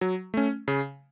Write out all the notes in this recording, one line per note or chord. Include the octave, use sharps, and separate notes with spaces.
F#3
A3 C#4
C#3